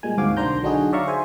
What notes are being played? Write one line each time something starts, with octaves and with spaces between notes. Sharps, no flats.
A#2 G3 G#3 G#5
D2 G#2 C4 F#4 F5 D6
B1 D#3 D4 C5 A#5 G6
D3 F#3 D4 D#4 F#4 G#4
C#5 D5 E5 F5 A#5 C#6
G#4 C5 E5 G#5